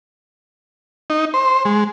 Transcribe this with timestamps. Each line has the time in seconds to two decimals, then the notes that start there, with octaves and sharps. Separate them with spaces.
1.10 D#4
1.34 C5
1.65 G#3